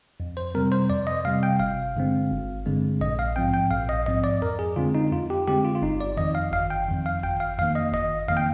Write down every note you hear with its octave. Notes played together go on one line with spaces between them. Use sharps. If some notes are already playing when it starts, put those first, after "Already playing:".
F2
C5
C3 G3 C4 A#4
C5
F2 D5
D#5
C3 G3 C4 F5
G5
G1 F5
G2 D3 G#3 C4
G1
G2 D3 G#3 C4
A#1 D#5
F5
G#2 F3 C4 G5
G5
A#1 F5
D#5
G#2 F3 C4 D#5
D5
F2 A#4
G#4
D3 G#3 C4 F4
D#4
F2 F4
G4
D3 G#3 C4 G4
F4
F4
G1 D#4
D5
F2 D#3 D#5
F5
G1 F5
G5
F2 D#3
F5
G1 G5
F5
F2 D#3 A#3 F5
D#5
G1 D#5
F2 D#3 A#3 F5
G5